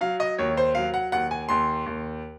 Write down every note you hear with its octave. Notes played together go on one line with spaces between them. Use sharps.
F#3 F5
D#5
D#2 C#5
C5
F#3 F5
F#5
D#2 F#5
G#5
D#2 C6
D#2